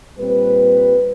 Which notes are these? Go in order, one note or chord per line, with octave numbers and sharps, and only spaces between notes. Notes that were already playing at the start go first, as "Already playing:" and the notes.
A#2 G3 C4 B4